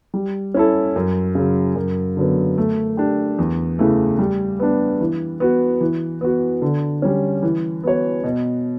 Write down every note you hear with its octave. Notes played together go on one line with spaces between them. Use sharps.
G3
C#4 E4 A4
F#2
C#3 F#3
F#2
D3 F#3 B3
A3
D4 G4
E2
C#3 E3 A3
G3
B3 D4
E3
B3 F#4
E3
B3 F#4
D3
G3 C#4
E3
B3 F#4 C#5
B2